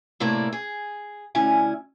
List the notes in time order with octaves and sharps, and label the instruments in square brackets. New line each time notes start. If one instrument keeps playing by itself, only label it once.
[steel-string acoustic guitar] A2 C3 A3 A#3 E4 D5
G#4
D2 C#4 E4 G#5